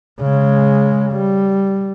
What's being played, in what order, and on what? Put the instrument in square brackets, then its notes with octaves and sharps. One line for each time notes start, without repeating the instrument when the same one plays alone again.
[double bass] C#3 G#3
G3